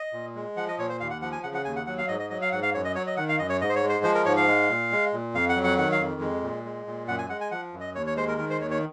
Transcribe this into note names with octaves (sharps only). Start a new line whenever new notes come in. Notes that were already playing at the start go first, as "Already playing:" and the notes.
Already playing: D#5
A#2
G#3
F3 F#5
D#5
A#2 C#5
C5
D#2 F5
F#5
F3 F#5
G#5
C#3 F#5
F#5
D#2 G#5
F#5
F#3 F#5
F5
G#2 D#5
D#5
F#3 D#5
F5
G#2 F#5
F5
F#2 C#5
D#5
F#3 C#5
D#5
D#3 F#5
F5
F#2 D#5
C#5
G#2 D#5
C5
C#5
G#3
C5
F3 C5
A#4
G#2 C#5
F5
G#3
A#2
G#3
A#2
F2 F5
F#5
F#3
F#5
D#3 F#5
F5
F2
G#3
A#2
G#3
A#2
F#2 F#5
G#5
G#3 F#5
G#5
F3 F#5
F#2
D#5
D#2 C#5
C#5
G#3 C5
A#4
D#3 A#4
C5
D#2 C#5
C#5